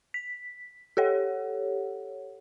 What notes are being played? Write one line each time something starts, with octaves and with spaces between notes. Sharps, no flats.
B6
G4 A4 C#5 F#5